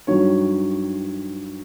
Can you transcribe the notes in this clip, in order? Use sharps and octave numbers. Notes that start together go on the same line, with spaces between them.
G2 D#3 F#3 C#5